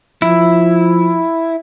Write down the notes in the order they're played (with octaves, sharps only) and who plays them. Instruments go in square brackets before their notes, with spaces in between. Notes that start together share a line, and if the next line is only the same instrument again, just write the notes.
[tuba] F3 [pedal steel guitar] E4